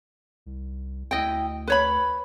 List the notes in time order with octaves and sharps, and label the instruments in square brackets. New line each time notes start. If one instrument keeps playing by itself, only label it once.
[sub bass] C2
[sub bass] D2 [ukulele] E4 D#5 G5
[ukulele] B4 C#5 B5